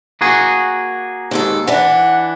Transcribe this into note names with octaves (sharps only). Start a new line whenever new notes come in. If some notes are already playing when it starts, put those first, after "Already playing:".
A#3 F#4 G#4
D#2 G#2 A4
E3 D4 F#5